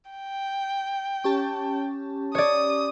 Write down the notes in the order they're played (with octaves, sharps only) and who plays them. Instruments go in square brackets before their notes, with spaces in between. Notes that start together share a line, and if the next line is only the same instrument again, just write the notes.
[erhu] G5
[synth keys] C#4 G4 A5
[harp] C#5 D5 [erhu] D#6